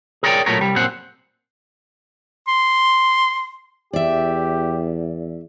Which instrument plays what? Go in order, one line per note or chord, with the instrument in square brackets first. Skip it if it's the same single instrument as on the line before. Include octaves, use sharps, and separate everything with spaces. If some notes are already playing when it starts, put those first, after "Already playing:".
[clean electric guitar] G#4 A#4 C#5 D5 G5
A#2 F#3 A3 B3 A#4 C#5
C2 G3
F#2 A#2 C4 C5 F#5
[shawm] C6
[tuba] E2 [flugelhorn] G4 [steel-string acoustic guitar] D5 E5